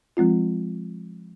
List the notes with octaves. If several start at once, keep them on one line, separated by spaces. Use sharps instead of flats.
F3 G#3 C4 F4